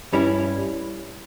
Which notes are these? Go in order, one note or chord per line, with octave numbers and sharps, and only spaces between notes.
G2 G3 C#4 E4